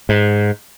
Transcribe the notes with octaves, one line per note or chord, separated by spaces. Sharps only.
G#2